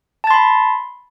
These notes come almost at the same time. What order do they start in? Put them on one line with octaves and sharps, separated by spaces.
A5 A6 C6 B5